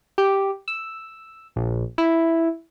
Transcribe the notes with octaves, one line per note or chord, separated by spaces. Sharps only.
G4
E6
A#1
E4